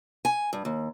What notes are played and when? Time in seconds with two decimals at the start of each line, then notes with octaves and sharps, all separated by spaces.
0.25 G#5
0.53 G2
0.65 D#2